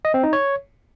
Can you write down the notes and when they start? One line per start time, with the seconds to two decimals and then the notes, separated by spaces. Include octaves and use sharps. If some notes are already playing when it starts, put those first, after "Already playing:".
0.05 D#5
0.14 C4
0.23 D#4
0.33 C#5